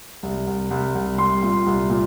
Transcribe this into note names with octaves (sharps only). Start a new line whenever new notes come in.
C2
C2
C2
C2
G3 C6
A#2
C2
A#2